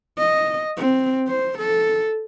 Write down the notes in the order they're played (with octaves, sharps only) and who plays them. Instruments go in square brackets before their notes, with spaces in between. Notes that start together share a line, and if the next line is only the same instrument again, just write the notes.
[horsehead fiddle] D#5
C4
C5
A4